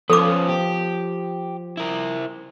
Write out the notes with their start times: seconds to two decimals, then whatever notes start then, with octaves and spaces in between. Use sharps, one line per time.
0.10 F3 B3 C#4 A4 D6
0.49 G4
1.77 E4 A#4